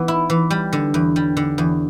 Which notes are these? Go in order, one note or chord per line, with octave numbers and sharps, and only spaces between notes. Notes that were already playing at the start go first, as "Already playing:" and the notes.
Already playing: E3 B3
E4
E3
G3
D3
E2
G3
D3
E2